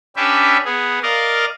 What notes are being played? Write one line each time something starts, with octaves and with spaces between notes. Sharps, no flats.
C#4 D4 G4 B4 E5
B3 G#4
A#4 D5 D#5 F5